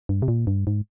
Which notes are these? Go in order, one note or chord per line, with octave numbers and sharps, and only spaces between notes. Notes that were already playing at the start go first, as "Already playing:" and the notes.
G2
C3
A#2
G2
G#2